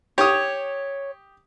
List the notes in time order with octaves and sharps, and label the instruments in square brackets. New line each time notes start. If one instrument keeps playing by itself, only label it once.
[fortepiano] G4 D#6 [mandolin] C#5